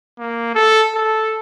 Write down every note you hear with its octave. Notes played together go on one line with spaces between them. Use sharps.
A#3
A4
A4